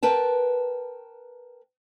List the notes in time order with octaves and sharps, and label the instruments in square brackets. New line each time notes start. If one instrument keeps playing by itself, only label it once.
[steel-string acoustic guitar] A#4 B4 G5 A5